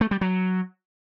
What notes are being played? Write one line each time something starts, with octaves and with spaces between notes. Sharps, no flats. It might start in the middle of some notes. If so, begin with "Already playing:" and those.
A3
G3
F#3